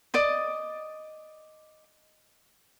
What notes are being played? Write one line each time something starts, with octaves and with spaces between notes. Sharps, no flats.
D5 D#5 D#6